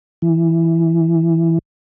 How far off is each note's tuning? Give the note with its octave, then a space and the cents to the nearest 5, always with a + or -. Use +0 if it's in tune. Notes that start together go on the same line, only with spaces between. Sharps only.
E3 +5